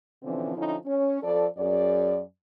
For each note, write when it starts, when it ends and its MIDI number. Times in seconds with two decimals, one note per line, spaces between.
0.23 0.55 47
0.23 0.55 50
0.23 0.55 52
0.23 0.55 53
0.23 0.55 60
0.23 0.55 61
0.56 0.75 50
0.56 0.75 53
0.56 0.75 61
0.56 0.75 63
0.56 0.75 64
0.86 1.20 61
1.22 1.46 41
1.22 1.46 69
1.22 1.46 74
1.58 2.20 42
1.58 2.20 68
1.58 2.20 74